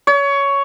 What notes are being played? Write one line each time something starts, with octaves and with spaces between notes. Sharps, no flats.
C#5